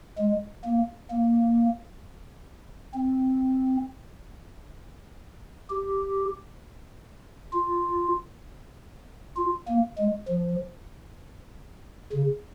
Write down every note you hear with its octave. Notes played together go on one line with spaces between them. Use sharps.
G#3
A#3
A#3
C4
G4
F4
F4
A#3
G#3
F3
C#3